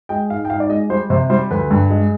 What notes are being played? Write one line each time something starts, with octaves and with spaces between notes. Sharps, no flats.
G#3 G5
G#2 F5
G5
G#2 F5
D5
G#3 D#5
G3 C5
C3 C5
G3 C5
D2 B4
G2
G#3